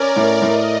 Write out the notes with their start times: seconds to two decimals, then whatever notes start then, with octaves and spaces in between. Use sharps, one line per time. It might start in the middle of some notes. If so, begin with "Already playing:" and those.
Already playing: C#4 A#4 D5
0.16 A2
0.42 A2 D#5